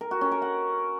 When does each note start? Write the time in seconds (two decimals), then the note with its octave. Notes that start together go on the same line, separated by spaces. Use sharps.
0.01 A#4
0.11 F#4
0.21 C#4
0.32 A#4
0.42 F#5